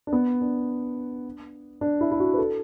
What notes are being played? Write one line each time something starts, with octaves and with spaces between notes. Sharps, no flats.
D4
B3
D4
D4
E4
E4
F#4
B4
A4